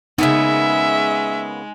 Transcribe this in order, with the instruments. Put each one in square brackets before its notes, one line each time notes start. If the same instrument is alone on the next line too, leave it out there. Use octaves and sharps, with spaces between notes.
[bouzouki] C#3 A#3 B3 [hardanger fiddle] G#3 [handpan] D#4 [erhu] E5